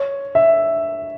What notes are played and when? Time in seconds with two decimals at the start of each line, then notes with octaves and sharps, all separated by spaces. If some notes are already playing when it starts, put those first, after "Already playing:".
Already playing: C#5
0.35 E5